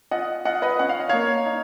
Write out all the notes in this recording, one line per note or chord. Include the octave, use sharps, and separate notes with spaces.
F4 D#5 F#5
F4 D#5 F#5
B4 D#5
C#4 F#5
F5
D#5
A#3 C#5 F5
D#4